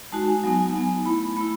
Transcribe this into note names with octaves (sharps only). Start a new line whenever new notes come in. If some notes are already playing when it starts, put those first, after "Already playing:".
G#3 D#4 F#4 A5
G#5
F#3 B3 D#4 G#5
G#5
F#3 B3 D#4
A3 E4 B5
B5
A3 E4 B5